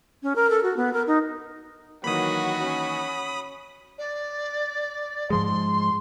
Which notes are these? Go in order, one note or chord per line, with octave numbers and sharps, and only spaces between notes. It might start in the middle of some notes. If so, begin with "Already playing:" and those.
C#4
A#4
A4
F#4
B3
A#4
D#4
D#3 E3 F#3 A#3 F#4 B5 D#6
C#4
D5
G#2 F3 G#3 C6